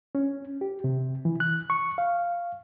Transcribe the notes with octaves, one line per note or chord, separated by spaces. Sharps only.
C#4
G4
C3
E3
F#6
C#6
F5